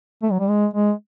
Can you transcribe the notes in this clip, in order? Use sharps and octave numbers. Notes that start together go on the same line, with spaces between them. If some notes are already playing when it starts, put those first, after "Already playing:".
A3
F#3
G3
G#3
G#3